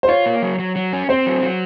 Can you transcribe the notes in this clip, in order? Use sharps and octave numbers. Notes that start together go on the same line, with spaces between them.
C5
F4 C#5
A#3
F#3
F#3
F#3
C#4
C4 C5
F#3
F#3